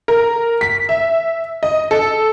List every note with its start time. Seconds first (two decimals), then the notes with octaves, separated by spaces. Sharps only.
0.08 A#4
0.61 B6
0.89 E5
1.63 D#5
1.91 A4